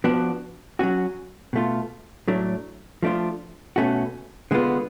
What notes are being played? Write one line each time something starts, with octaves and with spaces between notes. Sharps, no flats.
F3 B3 D4 F#4
F#3 C#4 F#4
B2 A3 F4
A2 F#3 A3 D4
F3 A3 D4 F4
B2 A3 C#4 F#4
D3 G#3 B3 F4